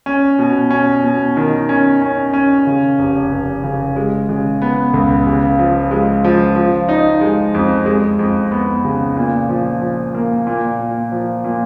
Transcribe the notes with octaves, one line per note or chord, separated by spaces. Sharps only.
C#4
B2
C#4
B2
D#3
C#4
C#4
C#4
C#3
F1
F1
C#3
G#3
C#3
B3
C#2
C#3
F3
G#3
F3
F3
D#4
G#3
F2
G#3
F2
B3
C#3
A#2
F3
F3
A#3
A#2
A#2
F3
A#2